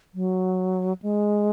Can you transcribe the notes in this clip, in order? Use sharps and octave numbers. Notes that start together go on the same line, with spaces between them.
F#3
G#3